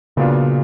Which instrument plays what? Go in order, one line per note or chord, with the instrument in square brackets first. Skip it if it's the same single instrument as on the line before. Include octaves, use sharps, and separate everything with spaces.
[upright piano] A#2 F#3 B3 D4 F4 [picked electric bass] C#3